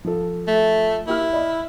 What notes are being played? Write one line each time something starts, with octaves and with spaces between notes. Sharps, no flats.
F3 A4
A3
A#3 E4 G4 F6
D5 D#5 B5